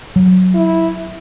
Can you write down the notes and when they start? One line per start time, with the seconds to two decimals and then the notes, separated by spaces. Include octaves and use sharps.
0.16 F#3
0.55 E4